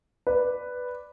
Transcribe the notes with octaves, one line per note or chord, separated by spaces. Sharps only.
B4 D5